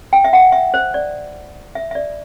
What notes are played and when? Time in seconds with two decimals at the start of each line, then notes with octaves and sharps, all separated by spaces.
0.13 G5
0.24 E5
0.33 F#5
0.52 E5
0.74 C5
0.94 D5
1.75 E5
1.91 E5
1.95 D5